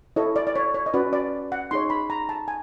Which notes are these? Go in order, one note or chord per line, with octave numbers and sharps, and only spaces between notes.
E4 A4 C#5 D#5
D5
D5
C#5
C#5
D#5
C#4 F#4 B4 D5
D5
F#5
D#4 G#4 C#5 C6
B5
A#5
A5
G#5